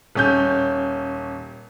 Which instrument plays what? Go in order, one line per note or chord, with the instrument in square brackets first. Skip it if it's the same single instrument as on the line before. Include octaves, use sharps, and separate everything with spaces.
[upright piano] D#1 C#4 G6